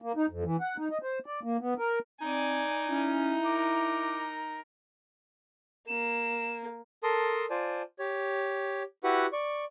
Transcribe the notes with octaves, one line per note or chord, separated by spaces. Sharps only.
A#3
D#4
F2
E3
F#5
D#4
D#5
C5
D5
A#3
B3
A#4
C4 D#4 D5 G#5
C#4 E4
A#4 D6
A#3 E7
A4 A#4 A5 C6 D#6
F4 C5 D5 G#5 A5
G4 C#5
E4 F#4 G4 B4 F#5
D5 C#6